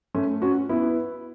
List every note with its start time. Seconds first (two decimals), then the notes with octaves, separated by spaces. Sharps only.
0.14 A3 C#4
0.42 C#4 F#4
0.69 B3 E4